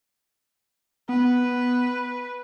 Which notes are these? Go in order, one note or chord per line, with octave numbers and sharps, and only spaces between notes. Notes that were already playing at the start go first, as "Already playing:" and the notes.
B3 B4